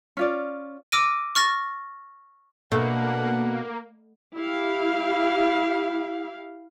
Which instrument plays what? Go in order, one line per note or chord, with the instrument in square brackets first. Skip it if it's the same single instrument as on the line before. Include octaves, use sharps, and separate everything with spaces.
[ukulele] C#4 F4 D5
[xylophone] D6 E6 F6 A#6 D7 D#7
C#6 F6 A6 A#6
[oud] B2 [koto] A3 [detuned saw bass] A#3 [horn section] D4 B4 F#5
[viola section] E4 G4 F5